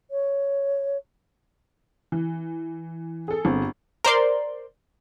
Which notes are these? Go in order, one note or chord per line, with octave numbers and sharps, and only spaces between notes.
C#5
E3
G#4 A4
G1 C4
A#4 C5 D5 C6